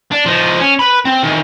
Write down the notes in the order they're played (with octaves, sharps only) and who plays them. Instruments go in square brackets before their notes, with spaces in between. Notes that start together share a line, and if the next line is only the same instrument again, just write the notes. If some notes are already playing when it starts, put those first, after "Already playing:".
[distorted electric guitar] D4
F3 D#4
C#4
B4 B5
C4
D#3 E3